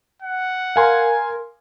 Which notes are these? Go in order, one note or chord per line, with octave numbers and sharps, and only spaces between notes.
F#5
A#4 F5 G#5 C6